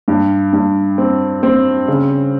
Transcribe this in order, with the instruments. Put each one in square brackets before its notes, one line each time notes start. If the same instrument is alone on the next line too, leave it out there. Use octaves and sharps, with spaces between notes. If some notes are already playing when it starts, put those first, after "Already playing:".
[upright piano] G2
G2
C4
C4
C#3